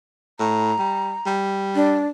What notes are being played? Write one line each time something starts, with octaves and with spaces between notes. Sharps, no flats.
A2 A#5
G3
G3
D4